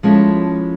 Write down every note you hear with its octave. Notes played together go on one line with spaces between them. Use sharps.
F3 G#3 C#4 E4 A4